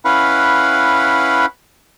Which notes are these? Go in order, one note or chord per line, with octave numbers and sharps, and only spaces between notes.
C#4 E4 B4 F5 F#5 B5